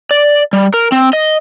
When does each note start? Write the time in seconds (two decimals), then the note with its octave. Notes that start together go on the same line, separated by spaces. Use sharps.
0.11 D5
0.53 G3
0.74 A#4
0.92 C4
1.13 D#5